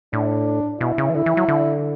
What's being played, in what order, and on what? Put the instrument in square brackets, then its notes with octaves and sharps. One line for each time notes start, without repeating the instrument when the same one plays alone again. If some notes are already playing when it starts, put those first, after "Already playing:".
[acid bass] A2 [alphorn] D4
[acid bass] B2 [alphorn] E4
[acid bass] C#3
E3
[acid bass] D3 [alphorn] E4
[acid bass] E3
F#3
D3